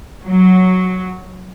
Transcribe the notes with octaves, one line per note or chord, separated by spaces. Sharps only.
F#3